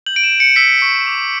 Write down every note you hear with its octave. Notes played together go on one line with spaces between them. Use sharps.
G6 F#7
D7
E7
G6
C#7
E6 B6
C#6
D6